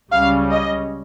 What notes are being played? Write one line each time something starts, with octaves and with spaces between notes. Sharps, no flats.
C#2 C#3 G3 C#4 F5
D#5